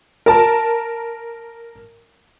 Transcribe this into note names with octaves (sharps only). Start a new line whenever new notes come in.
A#4 A5